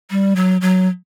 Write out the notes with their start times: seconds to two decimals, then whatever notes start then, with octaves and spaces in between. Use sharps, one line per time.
0.10 G3
0.36 F#3
0.61 F#3